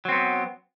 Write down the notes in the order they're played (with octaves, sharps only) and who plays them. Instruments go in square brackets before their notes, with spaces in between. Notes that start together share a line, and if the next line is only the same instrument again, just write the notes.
[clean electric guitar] F#3
C4
B3